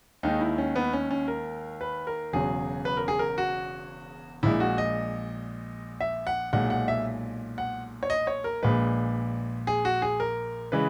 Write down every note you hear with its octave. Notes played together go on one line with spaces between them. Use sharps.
D#2 D#3 G#3 D#4
E4
C#4
B3
C#4
C#4
A#4
B4
A#4
E1 E2 C#3 F#3 G#4
B4
A#4
G#4
A#4
F#4
A#1 A#2 G#3 E4
F#4
D#5
E5
F#5
B1 A#2 G#3 F#5
F#5
E5
F#5
C#5
D#5
C#5
A#4
A#1 A#2 G#3 B4
G#4
F#4
G#4
A#4
C#3 E3 G#3 B4